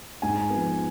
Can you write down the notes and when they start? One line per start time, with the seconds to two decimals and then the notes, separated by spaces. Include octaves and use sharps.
0.22 G#2 G#5
0.50 F3 B3